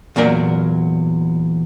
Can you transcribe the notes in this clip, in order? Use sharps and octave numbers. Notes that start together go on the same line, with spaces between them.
E2 A#2 F#3 A#4 D5